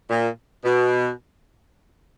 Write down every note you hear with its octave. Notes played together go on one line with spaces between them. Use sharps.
A#2
B2